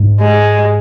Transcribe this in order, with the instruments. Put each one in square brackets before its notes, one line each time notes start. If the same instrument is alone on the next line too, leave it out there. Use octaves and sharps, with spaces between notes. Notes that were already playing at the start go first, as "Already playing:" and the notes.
Already playing: [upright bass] G#2
[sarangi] G#3